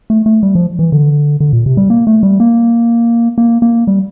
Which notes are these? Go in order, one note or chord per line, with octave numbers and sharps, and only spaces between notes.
A3
A3
G3
F3
E3
D3
D3
A#2
C3
G3
A#3
A3
G3
A#3
A#3
A#3
G3